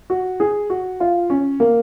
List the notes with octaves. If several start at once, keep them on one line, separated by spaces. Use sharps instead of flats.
F#4
G#4
F#4
F4
C#4
A#3